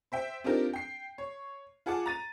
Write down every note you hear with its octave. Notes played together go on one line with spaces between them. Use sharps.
C5 E5 G5
C4 D4 D#4 F4 G4 A#4
G5 C7
C#5
F4 G#4 F#5 A5 D6
A#5 A6 D#7